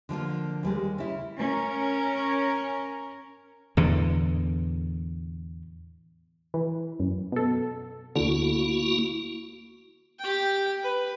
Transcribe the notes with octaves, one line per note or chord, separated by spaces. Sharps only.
D3 F3 A#3 F4
D#2 G3 G#3
C#3 E4
C#4 A#4
E2 A2 D3
E3
F#2
B2 A4
D2 D3 A#3 E4 F#4
G4 G5
B4